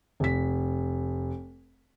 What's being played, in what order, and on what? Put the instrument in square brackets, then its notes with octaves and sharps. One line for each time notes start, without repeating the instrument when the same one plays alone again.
[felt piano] F1 B6